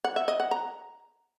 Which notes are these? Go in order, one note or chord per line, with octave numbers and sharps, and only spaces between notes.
F#5
E5
D#5
F#5
A#5